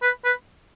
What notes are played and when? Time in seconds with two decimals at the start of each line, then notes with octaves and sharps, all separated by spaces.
0.02 B4
0.25 B4